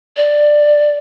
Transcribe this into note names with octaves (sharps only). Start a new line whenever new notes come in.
D5